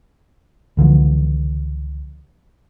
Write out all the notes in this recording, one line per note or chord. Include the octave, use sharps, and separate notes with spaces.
C#2 D3 E3 F3